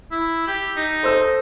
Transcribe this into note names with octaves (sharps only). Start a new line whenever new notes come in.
E4
G4
D#4
A4 C5 E6